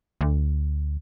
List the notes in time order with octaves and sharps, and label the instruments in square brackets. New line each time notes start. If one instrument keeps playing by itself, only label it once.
[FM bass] D2